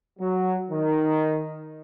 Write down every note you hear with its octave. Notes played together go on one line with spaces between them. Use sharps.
F#3
D#3